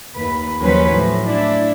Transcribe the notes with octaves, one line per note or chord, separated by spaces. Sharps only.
D#2 B4
D#2 F3 F#3 C#4 B4 C5
A2
D4 E4